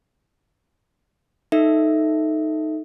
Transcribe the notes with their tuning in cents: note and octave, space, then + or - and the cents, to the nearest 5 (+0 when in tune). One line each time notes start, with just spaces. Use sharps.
D#4 +0 A4 +0 E5 +0